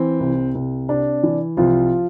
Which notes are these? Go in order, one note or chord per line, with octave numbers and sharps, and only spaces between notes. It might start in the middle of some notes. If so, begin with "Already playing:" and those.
Already playing: E3 C4
C2
C2
C3 D4
E3
C2 F3 F4